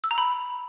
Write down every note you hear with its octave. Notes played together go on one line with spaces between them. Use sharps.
E6
A#5
B5